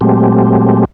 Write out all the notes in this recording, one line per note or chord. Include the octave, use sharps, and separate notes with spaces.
A#2 F#3 G#3 A3 C4 G4